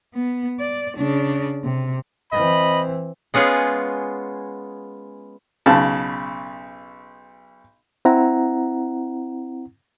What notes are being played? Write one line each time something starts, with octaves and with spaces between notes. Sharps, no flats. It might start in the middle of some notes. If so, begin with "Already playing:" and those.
B3
D5
C#3 D4
C3
E3 C4 D#5 B5
G#3 B3 C#4 F4 G#4
B1 C#3 A5
C4 E4 F#5 A#5